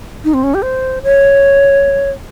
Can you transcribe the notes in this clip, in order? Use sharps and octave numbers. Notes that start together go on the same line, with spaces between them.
D#4
C4
C#4
G4
C5
C#5